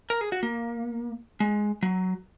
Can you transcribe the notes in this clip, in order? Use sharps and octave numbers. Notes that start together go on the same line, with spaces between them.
A#4
G#4
F#4
A#3
G#3
F#3